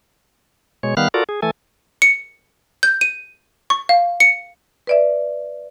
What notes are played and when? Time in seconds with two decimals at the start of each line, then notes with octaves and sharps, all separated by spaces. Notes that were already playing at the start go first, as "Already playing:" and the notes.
0.83 B2 G#3 C#5
0.97 D#3 G3 B3 F5 F6 F#6
1.14 F4 F#4 A4 A#4 D5
1.29 G#4
1.42 E3 A3 A4 G#5
2.02 C#7
2.83 G6
3.01 D#7
3.70 C#6
3.89 F5
4.20 C#7
4.87 B4 D5 E5